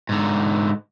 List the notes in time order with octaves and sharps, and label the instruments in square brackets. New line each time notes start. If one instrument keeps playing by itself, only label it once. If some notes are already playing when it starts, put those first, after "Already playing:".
[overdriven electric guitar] G#2 D3